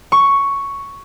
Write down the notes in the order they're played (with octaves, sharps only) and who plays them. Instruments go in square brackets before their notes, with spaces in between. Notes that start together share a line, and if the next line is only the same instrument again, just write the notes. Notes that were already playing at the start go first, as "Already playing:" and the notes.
[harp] C#6